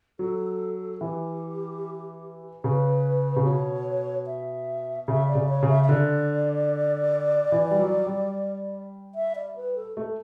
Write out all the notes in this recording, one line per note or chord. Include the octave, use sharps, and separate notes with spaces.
F#3 A4
E3 G4
C#3 B4
C#3
B2 C#5
E5
C#3 E5
D5
C#3
C#5
C#3
E5
E5
D3 D5
E3
G3
F#3
G3
E5
D5
B4
A4
A3